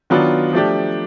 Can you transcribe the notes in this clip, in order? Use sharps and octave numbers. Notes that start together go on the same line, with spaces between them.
D#3 F#3 B3 D4 F4
F3 A3 D4 G4